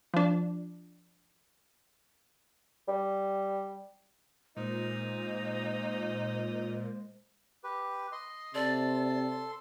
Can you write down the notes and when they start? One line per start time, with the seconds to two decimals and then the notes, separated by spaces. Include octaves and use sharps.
0.14 F3 D4
2.88 G3
4.57 A#2 G#3 D#4 C5
7.64 G4 B4
8.12 D#5 C6
8.55 C3 A4 D5 C6